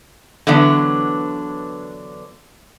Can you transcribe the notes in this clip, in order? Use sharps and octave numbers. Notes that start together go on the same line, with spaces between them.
D3 E3 F#3 B3 D4